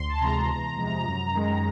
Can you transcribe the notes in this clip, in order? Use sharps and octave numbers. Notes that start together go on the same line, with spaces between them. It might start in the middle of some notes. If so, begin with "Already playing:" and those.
Already playing: D2 C6
A5
C3 E3 G#3 A#5
E2
C3 F3 G#3
F#2
D#3 G#3